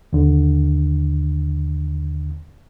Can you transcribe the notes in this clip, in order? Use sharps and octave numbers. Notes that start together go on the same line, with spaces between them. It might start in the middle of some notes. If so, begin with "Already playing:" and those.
D#2 D3